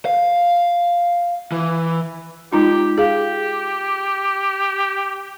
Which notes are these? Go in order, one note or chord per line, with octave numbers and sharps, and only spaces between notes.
F5
E3
G#3 D#4 F4 G4
G4 G#4 F5